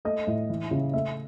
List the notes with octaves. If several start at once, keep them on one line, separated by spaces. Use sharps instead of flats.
A3 D#5
A2
E3
C#3
A3 E5